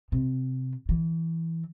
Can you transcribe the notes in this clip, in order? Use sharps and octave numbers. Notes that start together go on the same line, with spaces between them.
C3
E3